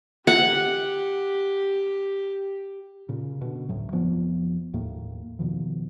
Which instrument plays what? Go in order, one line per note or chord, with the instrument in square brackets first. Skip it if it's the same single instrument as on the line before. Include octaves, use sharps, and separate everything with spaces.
[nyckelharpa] G4 [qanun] F#5
[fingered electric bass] A#2 C#3
B2 D3
G1 D2 A2 F#3
F1 F3 B3
E1 D#2 A2 A#3
E2 B2 D#3 F3